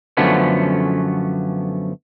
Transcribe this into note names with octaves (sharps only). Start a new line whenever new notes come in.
F#2 D3 F3 A3 B3 C#4